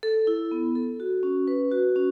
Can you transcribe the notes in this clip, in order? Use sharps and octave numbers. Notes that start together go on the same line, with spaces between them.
A4
E4
B3
A4
F#4
C#4
B4
F#4
C#4